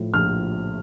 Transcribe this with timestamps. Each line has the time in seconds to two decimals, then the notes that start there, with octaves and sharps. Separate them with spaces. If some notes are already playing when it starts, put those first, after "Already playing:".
Already playing: A2 F3
0.14 A#1 F6